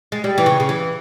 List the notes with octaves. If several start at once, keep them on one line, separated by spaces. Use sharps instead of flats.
G#3
G3
E3
C#3
C#3
E3